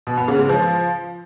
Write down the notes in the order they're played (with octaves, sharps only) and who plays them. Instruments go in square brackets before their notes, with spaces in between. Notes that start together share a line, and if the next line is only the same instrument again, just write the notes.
[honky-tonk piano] B2
B3
C#3
G#3
F3